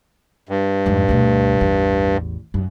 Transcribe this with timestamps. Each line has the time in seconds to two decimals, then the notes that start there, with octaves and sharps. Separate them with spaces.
0.49 G2
0.86 F2 G#2
1.09 D2 B2
1.60 A1 E2
2.54 F#2